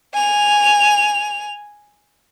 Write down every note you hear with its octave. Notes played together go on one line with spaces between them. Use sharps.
G#5 F7